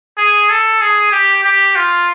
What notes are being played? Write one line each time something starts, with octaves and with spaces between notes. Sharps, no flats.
G#4
A4
G#4
G4
G4
F4